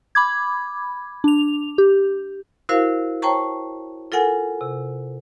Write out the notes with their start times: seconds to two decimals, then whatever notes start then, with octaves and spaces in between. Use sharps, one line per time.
0.15 B5 D6 G#6
1.24 D4 F7
1.78 G4
2.69 E4 F#4 A#4 C5 F5
3.22 C5 C#5 G5 A5 A#5 C#6
4.12 F4 A4 A#4 F#5 G#5
4.61 C3